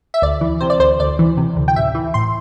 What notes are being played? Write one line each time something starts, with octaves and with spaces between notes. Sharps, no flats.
E5
D2 D5
E3
C3 C5
D5
D2 C5
D2 D5
E3
C3
D2
G5
A1 E5
E3
A2 C6